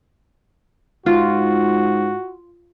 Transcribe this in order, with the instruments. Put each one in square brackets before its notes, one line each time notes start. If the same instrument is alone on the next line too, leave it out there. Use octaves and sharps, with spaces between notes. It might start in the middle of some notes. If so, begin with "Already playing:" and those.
[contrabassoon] G#2 [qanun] F4 [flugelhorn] F#4